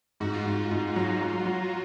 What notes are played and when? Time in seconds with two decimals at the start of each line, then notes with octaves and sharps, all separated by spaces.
0.20 G#2 F#4
0.33 F4
0.46 G#2 F#4
0.71 G#2
0.96 F#3
1.21 F#3
1.46 F#3